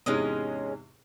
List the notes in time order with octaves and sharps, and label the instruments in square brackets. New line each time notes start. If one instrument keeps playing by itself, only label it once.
[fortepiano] E2 G#2 C3 [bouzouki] G#3 C#4 D#5